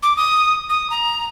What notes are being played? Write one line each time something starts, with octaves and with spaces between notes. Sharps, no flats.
D6
D#6
D#6
A#5